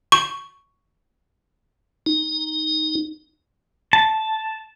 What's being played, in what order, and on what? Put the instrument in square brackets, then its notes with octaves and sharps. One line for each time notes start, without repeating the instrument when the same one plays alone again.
[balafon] C#6
[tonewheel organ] D#4
[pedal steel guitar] A5